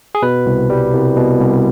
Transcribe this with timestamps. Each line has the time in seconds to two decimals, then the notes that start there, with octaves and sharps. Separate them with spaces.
0.15 G#4
0.22 B2 B4
0.46 C2
0.70 G3
0.93 C2
1.16 B2
1.40 C2